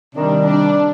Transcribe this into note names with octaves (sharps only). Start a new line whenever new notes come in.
C3 D#3 G3 D4
D4